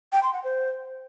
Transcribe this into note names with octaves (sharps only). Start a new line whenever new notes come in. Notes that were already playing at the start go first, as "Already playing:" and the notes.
G5
C6
F#5
C5